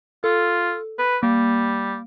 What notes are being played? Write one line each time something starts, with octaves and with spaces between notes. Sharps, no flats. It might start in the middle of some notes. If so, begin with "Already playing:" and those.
F4 A4
B4
G3 A#3